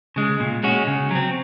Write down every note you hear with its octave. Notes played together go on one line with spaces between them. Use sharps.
C#3 G#3
A#2
G#3 C#4 F#4
C#3
F#3 C4